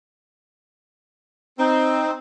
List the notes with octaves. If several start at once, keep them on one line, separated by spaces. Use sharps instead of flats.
C4 D#4